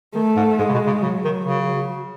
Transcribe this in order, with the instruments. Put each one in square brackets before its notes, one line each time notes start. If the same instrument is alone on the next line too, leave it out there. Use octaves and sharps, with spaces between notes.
[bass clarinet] D#3 [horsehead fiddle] A3
[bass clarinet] G#2
[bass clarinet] G#2 [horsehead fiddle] G#3
[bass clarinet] C#3
B2
C#3
[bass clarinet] C#3 [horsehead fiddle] F#3
[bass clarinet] D#3
C#3